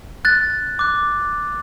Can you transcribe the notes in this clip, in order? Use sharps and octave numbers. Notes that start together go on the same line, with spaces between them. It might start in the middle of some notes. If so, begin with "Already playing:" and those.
F#6 A6
D6 F#6